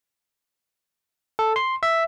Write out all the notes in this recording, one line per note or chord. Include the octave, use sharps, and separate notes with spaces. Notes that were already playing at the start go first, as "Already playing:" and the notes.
A4
C6
E5